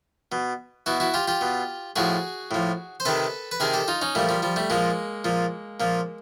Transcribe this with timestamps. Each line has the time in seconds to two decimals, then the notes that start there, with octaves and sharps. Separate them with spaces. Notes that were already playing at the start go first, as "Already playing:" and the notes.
0.32 B2
0.86 B2 E4 F#4
1.00 E4 F#4
1.14 F4 G4
1.28 F4 G4
1.41 B2
1.96 A2 F3 F#4 G#4
2.51 A2 F3
3.00 C5
3.05 C3 D#3 A4 B4
3.51 B4
3.60 C3 D#3 G#4 A#4
3.74 G4 A4
3.88 D#4 F4
4.02 C#4 D#4
4.15 A#2 F3 G3 A3
4.29 F3 G3
4.42 F3 G3
4.56 G3 A3
4.70 A#2 F3 G#3 A#3
5.24 A#2 F3
5.80 A#2 F3